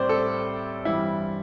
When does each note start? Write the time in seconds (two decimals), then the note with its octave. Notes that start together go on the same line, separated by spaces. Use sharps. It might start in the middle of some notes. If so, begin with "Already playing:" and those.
Already playing: A2 G3 C4 C5 D5
0.09 A4
0.85 G2 E3 G3 C4 E4